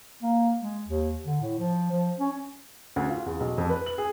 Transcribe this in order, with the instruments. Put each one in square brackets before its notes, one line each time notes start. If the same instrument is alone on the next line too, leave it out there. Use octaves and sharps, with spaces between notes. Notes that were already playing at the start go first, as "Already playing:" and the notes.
[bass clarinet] A#3
G#3
D#2
D3
A2
F3
F3
C#4
[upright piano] D2
F4
E2
B1
F2
B4
F#7
G#4